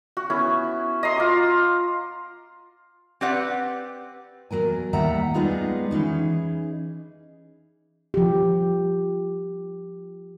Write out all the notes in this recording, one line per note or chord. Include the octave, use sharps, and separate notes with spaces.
F#4
B3 C#4 E4
D#5 A#5 C6
F4 D6
C4 G4 B4 D5 F#5
E2 F3 F#3 A#4 G#5
D#2 A2 G3 E5 F#5 A#5
G3 G#3 B3 D#4 F4 G#4
E3 C#4 D#4 G#4
F3 G4